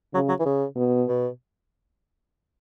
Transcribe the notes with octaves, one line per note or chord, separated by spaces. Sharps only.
C#3 F#3
F#3
E3
C#3
B2
B2